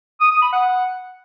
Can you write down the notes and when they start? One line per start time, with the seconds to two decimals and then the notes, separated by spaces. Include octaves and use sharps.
0.21 D#6
0.31 D#6
0.42 B5
0.53 F#5